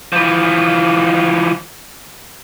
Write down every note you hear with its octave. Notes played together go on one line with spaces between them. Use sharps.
E3 F3